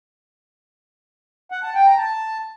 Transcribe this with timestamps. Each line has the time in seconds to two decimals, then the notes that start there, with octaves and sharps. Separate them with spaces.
1.52 F#5
1.63 A5
1.75 G5
1.87 A#5
1.98 A5